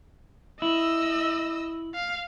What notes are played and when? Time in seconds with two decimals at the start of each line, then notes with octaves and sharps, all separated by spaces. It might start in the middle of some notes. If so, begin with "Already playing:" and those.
0.62 E4 D#5 E6
1.95 F5